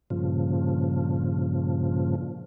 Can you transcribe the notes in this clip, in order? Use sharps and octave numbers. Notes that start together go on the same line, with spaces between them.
G2 A#2 C#3 F3